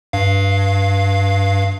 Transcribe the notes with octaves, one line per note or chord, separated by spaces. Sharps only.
G2 F5